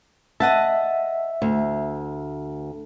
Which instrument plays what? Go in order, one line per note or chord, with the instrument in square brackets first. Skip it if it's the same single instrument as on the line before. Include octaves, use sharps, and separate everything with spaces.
[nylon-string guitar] D#5 F#5 A5 [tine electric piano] E5
[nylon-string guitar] D2